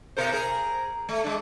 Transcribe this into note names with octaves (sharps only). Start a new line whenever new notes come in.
B2 A#4 C5
G#4 A#4
A3
G#3 D4